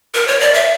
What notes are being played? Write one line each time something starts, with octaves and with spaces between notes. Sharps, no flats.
A#4
C#5
D5
E5